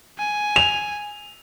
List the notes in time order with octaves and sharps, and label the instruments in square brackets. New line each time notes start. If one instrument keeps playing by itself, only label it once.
[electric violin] G#5
[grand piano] F7